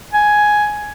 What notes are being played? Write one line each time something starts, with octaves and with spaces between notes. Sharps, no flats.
G#5